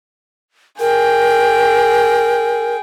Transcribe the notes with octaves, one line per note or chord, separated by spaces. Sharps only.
G#4 A#4 G5